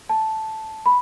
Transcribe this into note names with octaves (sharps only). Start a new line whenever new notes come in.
A5
B5